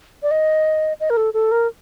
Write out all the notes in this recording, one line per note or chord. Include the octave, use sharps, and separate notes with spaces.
D5
D#5
D#5
A#4
A4
A4
A#4